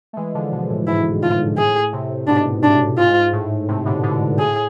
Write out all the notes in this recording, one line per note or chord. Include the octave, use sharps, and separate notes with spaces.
A3
E3 G#3
D3 F3
B2 D3
A2
G#2 B2 E4
A2 F4
A2 G#4
A2 C3
G#2 B2 D4
A2 D4
G#2 F4
A2
A2 C3
B2 D3
B2 D3
A2 G#4